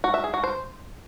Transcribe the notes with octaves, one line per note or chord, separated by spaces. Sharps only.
F#4
E5
G#4
F#4
C5